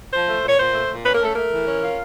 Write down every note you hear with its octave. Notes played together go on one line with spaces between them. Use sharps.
F3 C5
A3
A#2 C#5
A#2 C5
A3
A#2
C#4 B4
A#4
A3 A4
A3 A#4
E3
C#4
F4